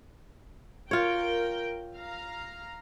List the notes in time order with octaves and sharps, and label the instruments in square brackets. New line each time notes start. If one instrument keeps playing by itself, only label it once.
[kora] F4 C#5 [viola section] A#4 G5
[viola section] F5 A#5